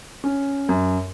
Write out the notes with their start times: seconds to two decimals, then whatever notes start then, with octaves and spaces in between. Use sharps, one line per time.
0.24 C#4
0.69 F#2